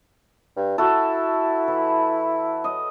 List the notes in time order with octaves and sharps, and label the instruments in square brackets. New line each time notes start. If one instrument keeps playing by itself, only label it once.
[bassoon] G2
[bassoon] E4 [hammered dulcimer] F#4 A4
[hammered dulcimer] E3
D#5